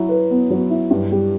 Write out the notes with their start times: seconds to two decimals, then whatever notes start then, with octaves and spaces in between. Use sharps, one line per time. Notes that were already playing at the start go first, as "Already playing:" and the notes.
Already playing: F#3 E4
0.09 B4
0.30 B3
0.50 F#3
0.70 E4
0.90 G2
1.12 G3